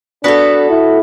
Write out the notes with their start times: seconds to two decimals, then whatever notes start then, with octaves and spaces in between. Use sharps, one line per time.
0.24 B3 D4 F#4 A4
0.70 E4